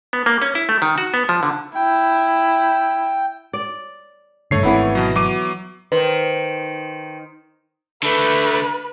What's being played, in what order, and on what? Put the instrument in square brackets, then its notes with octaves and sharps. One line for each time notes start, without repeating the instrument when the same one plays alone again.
[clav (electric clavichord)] B3
A#3
C#4
E4
A3
D#3
F#4
B3
F3
D3
[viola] E4 [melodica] G5
[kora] D5
[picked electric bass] G2 D3 [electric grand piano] A3 C#5 C7
[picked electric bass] G#1 C4 [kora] E3 B3 E4
[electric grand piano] B2 F#3
F#3 D6 D#7
[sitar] D#3 [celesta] B4 [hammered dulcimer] C5 A#5
[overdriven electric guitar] D3 A3 [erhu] B4